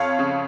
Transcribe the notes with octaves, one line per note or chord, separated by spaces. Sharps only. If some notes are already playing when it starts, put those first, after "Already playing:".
Already playing: F2 C#5 F5
C#3